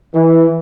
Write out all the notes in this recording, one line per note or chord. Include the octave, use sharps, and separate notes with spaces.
E3